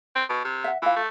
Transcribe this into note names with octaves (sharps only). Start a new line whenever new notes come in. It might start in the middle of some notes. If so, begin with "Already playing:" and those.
C4
B2
C3
E5 F#5
E3 F4 F5
A3